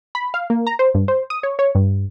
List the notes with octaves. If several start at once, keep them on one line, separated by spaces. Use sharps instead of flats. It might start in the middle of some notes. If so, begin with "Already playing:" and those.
B5
F5
A#3
A#5
C5
G2
C5
D#6
C#5
C#5
G2